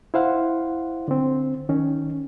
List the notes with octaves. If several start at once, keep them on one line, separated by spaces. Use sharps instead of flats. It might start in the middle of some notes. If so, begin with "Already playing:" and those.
E4 C5 F5 F#5
D3 C4
D#3 C#4